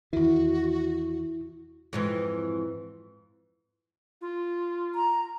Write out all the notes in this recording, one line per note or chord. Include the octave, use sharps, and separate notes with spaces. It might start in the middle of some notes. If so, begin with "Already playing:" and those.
E2 D#3 E4 F#4
F2 G#2 E3
F4
A#5